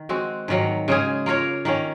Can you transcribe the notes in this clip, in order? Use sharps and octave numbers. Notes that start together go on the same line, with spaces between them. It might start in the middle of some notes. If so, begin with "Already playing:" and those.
Already playing: D#3
G#3 C4 F#4
G#2 D#3 F#3 A#3
C#3 G#3 C#4 G#4
A#3 F4 A#4 C#5
D#3 A#3 C#4